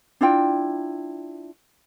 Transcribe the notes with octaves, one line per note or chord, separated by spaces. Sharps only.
D4 E4 F4 G5